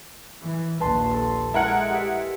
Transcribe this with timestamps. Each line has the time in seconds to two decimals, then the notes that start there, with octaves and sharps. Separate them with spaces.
0.44 E3
0.80 A#1 D#2 B4 A5 C6
1.14 A4
1.54 G#3 E4 A#4 F#5
1.90 G4 E5